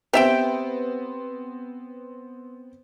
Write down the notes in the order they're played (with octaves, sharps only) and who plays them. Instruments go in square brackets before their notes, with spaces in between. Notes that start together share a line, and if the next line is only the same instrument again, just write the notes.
[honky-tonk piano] B3 C4 [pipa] G4 E5 G5